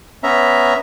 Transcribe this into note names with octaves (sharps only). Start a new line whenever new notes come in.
B3 C#4 E5 A#5